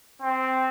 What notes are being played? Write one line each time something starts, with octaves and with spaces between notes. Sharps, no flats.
C4